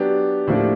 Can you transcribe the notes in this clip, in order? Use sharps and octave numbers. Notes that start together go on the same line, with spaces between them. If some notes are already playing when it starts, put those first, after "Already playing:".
Already playing: F#3 B3 D4 G4
A2 F3 A#3 D4 G4